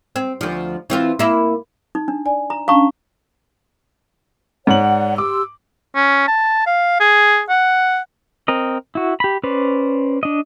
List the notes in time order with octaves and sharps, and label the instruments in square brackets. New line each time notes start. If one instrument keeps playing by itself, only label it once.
[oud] C4
D2 F3
E3 C4 F4
A#3 E4
[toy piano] D#4
D4
[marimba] D5 G#5
[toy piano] A#5
[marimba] C#4 D4 A5 [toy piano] F5 A#5 C#6
[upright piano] G#2 F#7 [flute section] C#5 D5 F#5
[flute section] G4 C6 E6 [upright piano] D6
[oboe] C#4
A5
F5
G#4
F#5
[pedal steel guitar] C4 A#4 D#5
E4 F#4
G4 B5
C#4 B4 C5 D5
D4 D#5